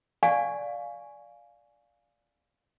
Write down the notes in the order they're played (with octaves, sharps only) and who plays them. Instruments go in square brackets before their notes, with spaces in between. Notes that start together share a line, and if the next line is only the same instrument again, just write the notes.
[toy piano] D5 F5 G#5 C#6